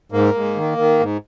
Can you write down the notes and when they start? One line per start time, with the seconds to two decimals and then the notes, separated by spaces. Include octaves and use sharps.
0.12 G#2 A#3
0.34 G#2
0.56 D#3
0.78 D#3
0.99 G#2